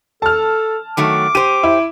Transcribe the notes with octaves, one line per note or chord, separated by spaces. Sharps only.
A4 A5 F6
D#3 F#3 A3 D6
G4 C5 D#7
E4